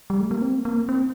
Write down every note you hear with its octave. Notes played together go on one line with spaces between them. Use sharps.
G3
A3
A#3
C4
A#3
C4